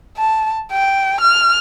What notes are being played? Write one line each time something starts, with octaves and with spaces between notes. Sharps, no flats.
A5
G5
F6